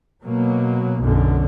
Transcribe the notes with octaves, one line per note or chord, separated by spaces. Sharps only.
B2 F#3 A#3
B1 F#2 D3